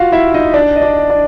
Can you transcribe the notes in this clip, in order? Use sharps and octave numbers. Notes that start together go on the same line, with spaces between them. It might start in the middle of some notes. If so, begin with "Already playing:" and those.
Already playing: F4 F#4 F5 F#5
E4 E5
D#4 D#5
D4 D5
D#5
D4 D5
D4 D5